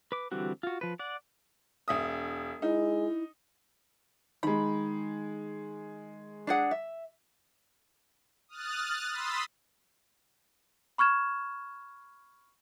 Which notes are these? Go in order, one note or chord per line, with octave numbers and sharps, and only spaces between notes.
B4 D6
D3 E3 G3 C4 F#4
F4 F#4
F3 B4
D5 F#5
E1 E5 D#6
G#3 D#4 E4
D#3 G#3 B5
D4 G#4 F#5
E5
D#6 F6 F#6 A6
B5 C6 D#6 E6 A6 B6
B5 C#6 F6 G#6 E7